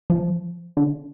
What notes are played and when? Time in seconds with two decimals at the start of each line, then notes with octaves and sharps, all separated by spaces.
0.10 F3
0.77 D3